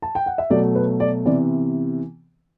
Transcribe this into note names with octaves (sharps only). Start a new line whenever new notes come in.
A5
G5
F#5
E5
B2 F#3 A3 D5
B4
D5
C3 E3 B3 D5